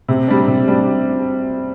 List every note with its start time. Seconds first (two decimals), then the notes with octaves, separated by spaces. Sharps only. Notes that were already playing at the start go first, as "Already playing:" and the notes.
0.09 C3
0.28 G3 D4
0.47 C3
0.67 G3 D4